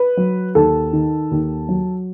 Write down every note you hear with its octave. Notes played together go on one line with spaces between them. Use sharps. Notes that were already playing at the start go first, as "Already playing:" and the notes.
Already playing: B4
F#3
D#2 A4
D#3
D#2
F#3